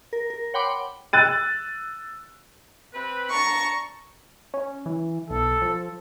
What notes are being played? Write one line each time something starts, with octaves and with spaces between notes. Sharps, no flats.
A#4
A#4
C#5 F#5 G5 B5 C6 D6
E6 F#6 A6 D#7
C4 B4
D4 A5 A#5 C#6
C#4
E3
B1 A4
F3